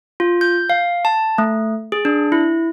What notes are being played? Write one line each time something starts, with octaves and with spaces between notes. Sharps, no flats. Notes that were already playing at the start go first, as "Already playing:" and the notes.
F4
G6
F5
A5
A3
G#4
D4
E4